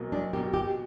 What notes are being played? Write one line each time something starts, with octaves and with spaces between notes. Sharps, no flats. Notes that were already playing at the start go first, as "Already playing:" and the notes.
Already playing: B1 B2 A#3
B1 D4
B2 A#3 G4
B2 G4